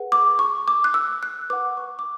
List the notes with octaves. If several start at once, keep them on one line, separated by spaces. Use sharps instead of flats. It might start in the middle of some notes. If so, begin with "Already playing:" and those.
Already playing: G#4 B4 F#5
D6
C#6
D6
F#6
E6
F#6
B4 F#5 D6
C#6
D6